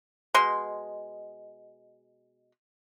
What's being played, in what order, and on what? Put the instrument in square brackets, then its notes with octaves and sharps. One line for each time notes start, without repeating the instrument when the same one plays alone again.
[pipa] B2 G#3 C6